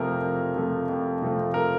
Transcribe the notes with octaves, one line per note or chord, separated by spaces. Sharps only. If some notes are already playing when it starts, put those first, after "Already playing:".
Already playing: F2 C3 F3 A3 A#4
F2
C3 F3 A3
F2
C3 F3 A3
A#4